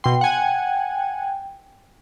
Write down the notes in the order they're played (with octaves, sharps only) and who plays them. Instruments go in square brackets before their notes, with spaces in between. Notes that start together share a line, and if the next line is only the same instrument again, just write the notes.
[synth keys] B2 C6 [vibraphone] G5
[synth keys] F#5 G#5